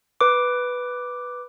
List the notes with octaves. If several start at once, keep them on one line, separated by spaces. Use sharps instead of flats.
B4 D6